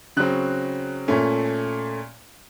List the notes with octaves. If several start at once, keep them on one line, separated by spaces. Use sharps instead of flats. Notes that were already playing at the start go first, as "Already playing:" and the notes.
C#3 F#3 C4 F#6
A#2 A3 C#4